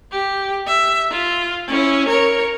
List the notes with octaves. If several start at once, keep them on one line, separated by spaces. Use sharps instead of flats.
G4
E5
F4
C#4 E4
A#4 C#5